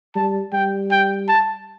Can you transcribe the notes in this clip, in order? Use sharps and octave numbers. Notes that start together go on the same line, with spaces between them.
G3 A5
G3 G5
G5
A5